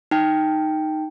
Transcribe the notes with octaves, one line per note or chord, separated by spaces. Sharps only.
D#4 G5